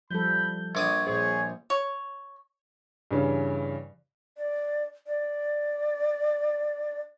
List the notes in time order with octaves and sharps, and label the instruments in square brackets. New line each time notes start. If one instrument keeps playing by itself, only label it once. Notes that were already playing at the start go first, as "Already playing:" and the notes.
[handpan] F3 G3 A4 [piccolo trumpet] B5 [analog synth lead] G6
[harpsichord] A#1 D5 D#6 [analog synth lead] C#6 [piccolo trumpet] G#6
[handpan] A#2 C5 [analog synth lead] G#4 [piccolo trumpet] C#5
[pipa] C#5
[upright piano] G2 C#3 E3
[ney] D5
D5